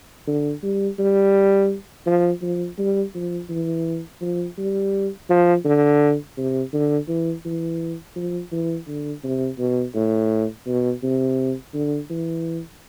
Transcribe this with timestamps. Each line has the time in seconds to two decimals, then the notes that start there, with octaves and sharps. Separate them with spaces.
0.27 D3
0.63 G3
0.99 G3
2.06 F3
2.42 F3
2.78 G3
3.15 F3
3.49 E3
4.21 F3
4.58 G3
5.30 F3
5.65 D3
6.37 C3
6.73 D3
7.08 E3
7.45 E3
8.16 F3
8.52 E3
8.88 D3
9.24 C3
9.59 B2
9.95 A2
10.67 B2
11.03 C3
11.74 D3
12.10 E3